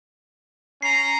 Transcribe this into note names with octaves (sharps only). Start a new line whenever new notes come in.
C#4 A#5 C7